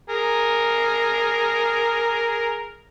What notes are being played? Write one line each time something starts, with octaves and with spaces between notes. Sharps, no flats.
G#4 A#4